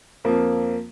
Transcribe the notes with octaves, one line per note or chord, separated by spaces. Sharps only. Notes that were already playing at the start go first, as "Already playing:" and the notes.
F2 F3 A#3